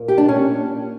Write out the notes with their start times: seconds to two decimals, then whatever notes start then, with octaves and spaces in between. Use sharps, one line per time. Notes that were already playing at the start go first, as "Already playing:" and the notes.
Already playing: A#2 A#3
0.08 G4
0.18 D4
0.28 C#4